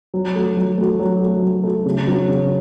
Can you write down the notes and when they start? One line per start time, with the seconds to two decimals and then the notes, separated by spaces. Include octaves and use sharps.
0.14 F#3
0.35 A3 F#4
0.57 F#3
0.78 A3 F#4
0.99 F#3
1.21 A3 F#4
1.42 F#3
1.64 A3 F#4
1.86 C#3
2.07 F#3 C#4 F#4
2.28 C#3